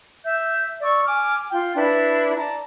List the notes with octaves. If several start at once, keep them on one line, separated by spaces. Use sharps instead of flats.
E5 G6
D5 C#6 E6
G#5 D6 F6
F4 G5
D4 E4 B4
D5 A5 A#5